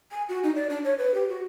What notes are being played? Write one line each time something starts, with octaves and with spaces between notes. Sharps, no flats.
G#5
F#4
D#4
D5
D4
C#5
B4
G4
F#4